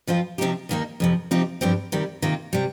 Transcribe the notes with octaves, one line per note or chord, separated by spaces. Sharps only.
F2 F3 C4 F4
C3 F3 C4 D#4 G4
D#2 D#3 A#3 D#4
F2 C3 F3
C3 F3 C4 D#4 G4
G2 F3 C4 G4
C3 D#3 G3
C3 D#3 A#3 F4
C3 G3